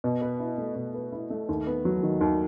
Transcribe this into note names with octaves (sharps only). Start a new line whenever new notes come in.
B2
B4
E4
A3
B2
B4
E4
A3
D#2
B3
F#3
D#3
D#2